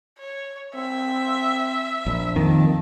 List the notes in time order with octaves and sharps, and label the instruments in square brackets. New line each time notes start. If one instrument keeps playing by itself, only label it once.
[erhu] C#5
[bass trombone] C4 [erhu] E5
[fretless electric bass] A#1
[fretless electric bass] F2 [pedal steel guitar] D#3 [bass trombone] F3 [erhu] A5